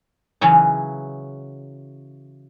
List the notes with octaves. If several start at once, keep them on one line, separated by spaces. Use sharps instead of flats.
C#3 E3 F#3 C#4